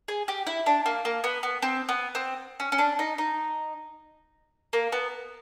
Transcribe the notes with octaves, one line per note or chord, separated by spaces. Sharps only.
G#4
G4
E4
D4
A#3
A#3
B3
B3
C4
B3
C4
C#4
C#4
D4
D#4
D#4
A#3
B3